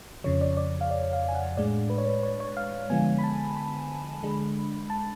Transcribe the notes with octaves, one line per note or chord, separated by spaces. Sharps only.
F2 C#3 F3 C#5
D5
D5
F5
D5
F5
G#5
F#5
A2 G#3 D4 D5
B4
C#5
B4
C#5
C#5
F5
D3 F3 G#3 B3 G#5
B5
A5
B5
D3 G#3 D4
A5